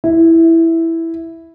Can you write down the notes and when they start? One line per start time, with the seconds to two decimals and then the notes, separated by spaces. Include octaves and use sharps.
0.04 E4